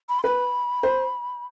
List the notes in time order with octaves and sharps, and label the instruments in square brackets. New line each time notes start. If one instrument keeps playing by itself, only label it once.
[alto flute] B5
C6
[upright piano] B4 [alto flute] B5
[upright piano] C5